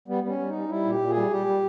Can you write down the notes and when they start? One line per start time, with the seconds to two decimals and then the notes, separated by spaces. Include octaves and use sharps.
0.08 G3 B3
0.23 G3 B3
0.28 C#4
0.39 G3
0.49 G3 D#4
0.69 G3 E4
0.85 A#2 G4
1.00 A#2
1.10 G#4
1.16 G3
1.31 G3 G4
1.46 G3